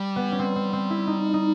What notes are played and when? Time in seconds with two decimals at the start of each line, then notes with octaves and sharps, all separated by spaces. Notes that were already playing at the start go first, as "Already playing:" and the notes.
Already playing: G3
0.16 B3
0.32 C#4
0.39 C4
0.56 C4
0.73 C4
0.90 E4
1.07 D#4
1.34 D#4